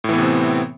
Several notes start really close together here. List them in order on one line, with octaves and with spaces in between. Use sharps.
A2 E3 B3 C3 C4